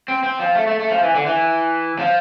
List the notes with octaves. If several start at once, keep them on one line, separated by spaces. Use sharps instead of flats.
C4
C4
F3
A3
A3
A3
F3
E3
D3
E3
F3